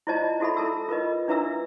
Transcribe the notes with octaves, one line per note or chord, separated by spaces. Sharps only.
E4 F4 C5 D5 D#5 A5
E4 F#4 A4 E5 B5
E4 A4 A5 E6
F4 A#4 B4 D#5
D4 E4 B4 E5 A#5 E6